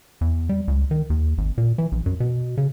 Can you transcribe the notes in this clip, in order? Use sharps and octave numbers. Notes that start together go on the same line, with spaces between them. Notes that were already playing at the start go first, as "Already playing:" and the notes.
E2
G3
C#2
D#3
D#2
G#1
A#2
E3
A#1
F#2
B2
C#3